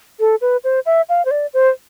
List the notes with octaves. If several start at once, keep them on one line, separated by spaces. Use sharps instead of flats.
A4
B4
C5
E5
F5
C5
D5
C5